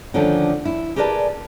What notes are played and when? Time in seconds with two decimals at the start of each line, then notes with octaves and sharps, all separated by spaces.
0.14 D3 D#3 F3 A3 C#4 D4
0.65 E4
0.96 G4 G#4 A#4 B4 D5 A5